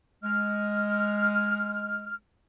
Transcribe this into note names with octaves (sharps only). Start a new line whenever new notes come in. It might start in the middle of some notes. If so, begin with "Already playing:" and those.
G#3 F6